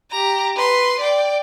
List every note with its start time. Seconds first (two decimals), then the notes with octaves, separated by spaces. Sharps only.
0.11 G4 A#5
0.56 B4 C6
0.99 D5 G5